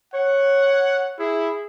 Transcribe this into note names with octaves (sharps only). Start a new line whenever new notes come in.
C#5 F#5
E4 G#4